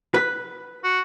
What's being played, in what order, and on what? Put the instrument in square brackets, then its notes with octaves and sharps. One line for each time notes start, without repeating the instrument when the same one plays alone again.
[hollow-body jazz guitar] B4
[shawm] F#4